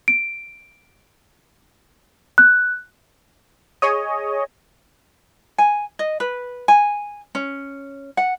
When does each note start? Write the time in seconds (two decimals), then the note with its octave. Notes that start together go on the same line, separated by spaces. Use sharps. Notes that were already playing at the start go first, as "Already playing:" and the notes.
0.08 D7
2.38 F#6
3.82 G#4 C#5 D#5
5.58 G#5
5.99 D#5
6.20 B4
6.68 G#5
7.35 C#4
8.17 F#5